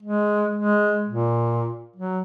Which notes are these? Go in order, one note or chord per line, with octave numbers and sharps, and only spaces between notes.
G#3
G#3
A#2
F#3